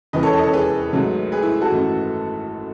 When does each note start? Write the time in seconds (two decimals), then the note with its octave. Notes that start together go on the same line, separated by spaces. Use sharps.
0.13 E1 D#2 C#3 E3 B4 D#5
0.23 A4 C#5
0.33 A4 C#5
0.38 D#5
0.43 A4 C#5
0.53 G#4 B4
0.93 G#1 G#2 F#3 A3
1.32 G#4 B4
1.42 E4
1.61 F#4 A4
1.71 G#1 F#2 E3 A3